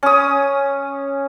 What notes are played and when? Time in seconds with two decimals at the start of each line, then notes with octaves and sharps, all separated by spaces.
0.03 C#4 D#6